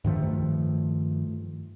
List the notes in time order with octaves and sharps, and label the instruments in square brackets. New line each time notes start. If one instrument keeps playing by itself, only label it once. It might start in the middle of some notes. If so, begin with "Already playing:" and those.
[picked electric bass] G2 D#3 F3 A3